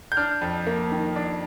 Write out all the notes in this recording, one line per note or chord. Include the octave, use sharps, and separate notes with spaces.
G6
D4 F6
F2
A#3
D#3
D4